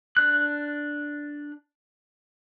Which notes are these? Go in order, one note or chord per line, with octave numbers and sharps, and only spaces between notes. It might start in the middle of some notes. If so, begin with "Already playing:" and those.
D4 F#6